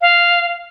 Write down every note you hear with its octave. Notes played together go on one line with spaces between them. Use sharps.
F5